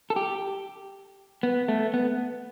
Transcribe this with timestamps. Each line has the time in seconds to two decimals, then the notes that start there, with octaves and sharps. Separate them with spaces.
0.10 A4
0.16 G4
1.43 B3
1.68 A3
1.94 B3